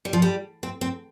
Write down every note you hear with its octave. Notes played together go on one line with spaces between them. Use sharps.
G3
F3
G3
C4
C4